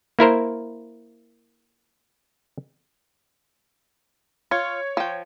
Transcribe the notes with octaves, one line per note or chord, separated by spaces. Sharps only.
A#3 E4 A#4 C5
F4 C#5 G#6 C#7
F3 G5